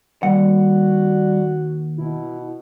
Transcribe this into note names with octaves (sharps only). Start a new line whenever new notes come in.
D#2 G3 F#4 F#5
B2 E4